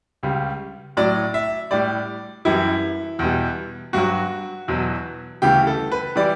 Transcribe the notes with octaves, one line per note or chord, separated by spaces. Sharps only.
C#2 C#3 G3
A2 F#3 D5
E5
A2 G3 D5
F#2 E3 G3 E4
E2 B2 G3
G2 F#3 F#4
E2 B2 F#3
D2 C#3 E3 G3 G4
A4
B4
E3 G3 D5